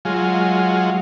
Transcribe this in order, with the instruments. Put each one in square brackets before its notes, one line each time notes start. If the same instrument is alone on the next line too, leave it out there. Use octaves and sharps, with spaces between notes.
[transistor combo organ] F#3 G#3 F4